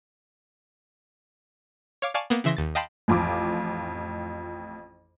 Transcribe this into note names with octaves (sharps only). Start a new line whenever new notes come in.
C#5 F5 D6
D5 F5 G#5 A5 C#6
A#3 B3
C#3 E3 E5 C6 A#6
D#2 A6
D#5 F5 G5 A5 B5 C6
A1 F2 F4 D6